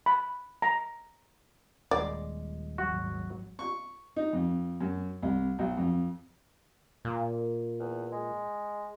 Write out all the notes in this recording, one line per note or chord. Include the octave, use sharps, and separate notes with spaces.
B5
A#5
D#1 G#3 D5
G#1 F#3 F#4
C#6
D#4
F2
F#2
C2
B1
F2
A#2
E2
G#3